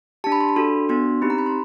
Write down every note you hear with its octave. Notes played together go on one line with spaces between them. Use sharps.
D4 G4 A5
B5
C6
B5
D4 F#4 A4 C6
B3 D4 F#4 C6
C4 D#4 G4 B5
A#5
B5
C6